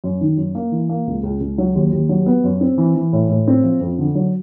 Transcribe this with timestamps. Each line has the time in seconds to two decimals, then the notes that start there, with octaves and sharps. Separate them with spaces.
0.04 F#2
0.21 D#3
0.37 F#2
0.55 A#3
0.72 E3
0.89 A#3
1.07 C#2
1.23 C#2
1.40 C#2
1.58 F#3
1.75 D#2
1.93 D#2
2.09 F#3
2.26 B3
2.44 F#2
2.61 C4
2.78 E3
2.95 E3
3.13 A2
3.29 A2
3.48 C4
3.64 F3
3.81 F2
3.99 D3
4.15 F#3